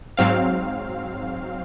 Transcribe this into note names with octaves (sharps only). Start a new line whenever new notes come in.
G#2 F#3 C4 F5